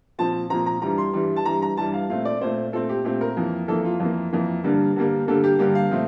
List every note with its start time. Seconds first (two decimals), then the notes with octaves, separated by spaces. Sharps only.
0.19 A#2 F3 C4 A5
0.50 A#2 F3 C4 A#5
0.66 A#5
0.82 G2 E3 G3 A#5
0.98 C6
1.14 G2 E3 G3
1.36 A5
1.45 G2 E3 G3 A#5
1.62 A#5
1.77 G2 E3 G3 A5
1.94 F5
2.09 A#2 A3 C4 F5
2.25 D5
2.41 A#2 A3 C4 C5
2.73 A#2 A3 C4 A4
2.89 G4
3.04 A#2 A3 C4 G4
3.21 A#4
3.37 F2 E3 A#3
3.68 F2 E3 A#3 A4
3.85 F4
4.00 F2 E3 A#3
4.33 F2 E3 A#3
4.64 G2 D3 G3 A#3
4.96 G2 D3 G3 A#3
5.28 G2 D3 G3 A#3 A4
5.44 G4
5.59 G2 D3 G3 A#3 G4
5.75 F5
5.91 A#2 F3 A3 C4